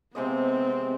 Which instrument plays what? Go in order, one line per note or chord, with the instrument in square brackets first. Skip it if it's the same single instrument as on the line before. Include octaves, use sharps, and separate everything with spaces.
[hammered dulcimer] C3 G#3 D#5 [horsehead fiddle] B3 C4